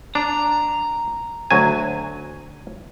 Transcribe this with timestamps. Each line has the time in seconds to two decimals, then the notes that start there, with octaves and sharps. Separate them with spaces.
0.15 D4 A#5
1.51 D2 F#3 G#5